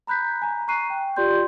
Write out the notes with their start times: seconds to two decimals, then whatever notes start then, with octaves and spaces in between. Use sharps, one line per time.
0.07 A#5 B5 F#6 G6 B6
0.42 G#5 A#5
0.68 A#5 C#6 F#6 C7 D#7
0.90 G5
1.16 F4 G4 D5 C6 G6